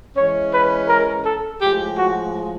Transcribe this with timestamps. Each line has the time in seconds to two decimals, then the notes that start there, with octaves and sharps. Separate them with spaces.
0.16 E3 G#3 C#4 C#5
0.52 B4
0.89 A#4
1.25 A4
1.61 A2 F3 G#3 G4
1.97 F#4